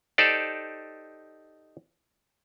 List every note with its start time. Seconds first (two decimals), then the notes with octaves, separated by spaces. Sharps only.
0.18 D#4 G4 A4 C5 D5